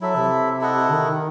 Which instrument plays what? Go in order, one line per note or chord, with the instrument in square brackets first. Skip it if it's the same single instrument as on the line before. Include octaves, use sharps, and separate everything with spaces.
[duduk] F#3 [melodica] E4 A4 E5
[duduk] C3
[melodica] E4 A4 D#5 F#5
[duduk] D#3